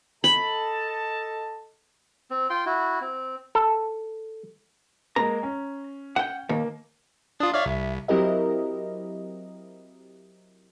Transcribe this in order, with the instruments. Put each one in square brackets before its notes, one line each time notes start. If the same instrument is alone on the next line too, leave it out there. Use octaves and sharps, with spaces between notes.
[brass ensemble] A4 D#5 A5 [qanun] B5
[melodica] C4
F4 G5 C6
E4 F#4
C4
[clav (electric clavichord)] A4
[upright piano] G#3 A#3 [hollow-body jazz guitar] A#5
[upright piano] C#4
[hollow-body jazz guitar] F#5 G5
[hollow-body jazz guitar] D#2 [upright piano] A#3
[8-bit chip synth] D4 F4 [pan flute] D#6
[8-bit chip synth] C#5 D5 F5 [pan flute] E5
[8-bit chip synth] C2
[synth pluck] F#3 C4 E4 G4 A#4 D#5